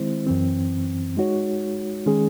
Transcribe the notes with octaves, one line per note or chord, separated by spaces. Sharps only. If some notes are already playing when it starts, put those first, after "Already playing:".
Already playing: D#3 G#3 C4 E4 C5
F#2 E3 C4
G#3 D#4 F#4 C#5
D#3 G#3 C#4 G#4